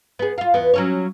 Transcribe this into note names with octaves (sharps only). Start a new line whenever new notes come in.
B3 G#4
F4 F5
E2 B3
F#3 C#4 C#5